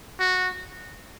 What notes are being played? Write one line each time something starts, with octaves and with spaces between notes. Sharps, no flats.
F#4